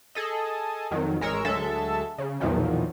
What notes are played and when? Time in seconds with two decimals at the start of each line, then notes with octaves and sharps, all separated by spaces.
0.15 G#4 A4 D#5
0.91 F2 D#3 F#3
1.20 A1 G#3 A#4 C#5 E6
1.45 D2 F#3 G#3 A4 E5
2.18 C#3
2.40 B1 E2 A#2 D#3 F3 F#3